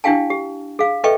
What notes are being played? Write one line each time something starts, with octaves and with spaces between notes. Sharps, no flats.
D4 E4 G4 F5 G5 A5
G4
G#4 F5
A4 B4 D#5 E5 G5 C#6